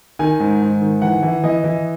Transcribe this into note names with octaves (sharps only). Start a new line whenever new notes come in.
D#3 G#5
G#2
G#2
D#3
E3 F#5
E3
E3 D#5
E3